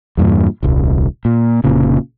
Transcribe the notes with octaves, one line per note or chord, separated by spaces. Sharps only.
E2 G2 A#2
D#1 C2
A#2
F1 A#2 C#3